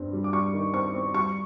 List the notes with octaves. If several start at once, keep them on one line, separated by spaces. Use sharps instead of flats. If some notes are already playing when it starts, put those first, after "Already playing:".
Already playing: G2 G3 C4
G3
D6
G3 C#6
D#3
C4 C#6
C4
G3 C#6